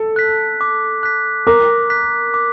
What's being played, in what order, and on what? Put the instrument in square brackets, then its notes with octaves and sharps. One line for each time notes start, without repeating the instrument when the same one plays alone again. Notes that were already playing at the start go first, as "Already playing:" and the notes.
Already playing: [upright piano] A4
[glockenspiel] F#6 B6
D6
F#6 B6
[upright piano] A#4 [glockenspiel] D6
[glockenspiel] F#6 B6
D6